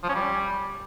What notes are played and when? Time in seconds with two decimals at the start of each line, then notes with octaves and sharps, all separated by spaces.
0.03 F3
0.09 C#4
0.14 G3